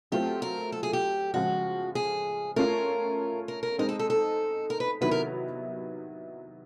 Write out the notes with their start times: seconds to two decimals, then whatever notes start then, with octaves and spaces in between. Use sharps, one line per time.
0.12 F#3 A3 C4 F4 G4 A4
0.42 A#4
0.72 A4
0.83 G#4
0.93 G4
1.34 C#3 F3 G#3 F#4
1.95 G#4
2.56 A3 C#4 F4 A#4
3.48 A#4
3.63 A#4
3.78 G#3 C4 D#4 A#4
3.89 A4
3.99 A4
4.10 A4
4.70 A#4
4.80 B4
5.01 C3 D#3 F#3 B3 E4 B4
5.11 A#4